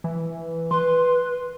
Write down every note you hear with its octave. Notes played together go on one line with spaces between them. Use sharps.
E3
B4 C6